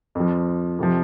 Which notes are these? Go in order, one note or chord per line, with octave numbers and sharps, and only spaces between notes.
F2 F3
F2 C3 F3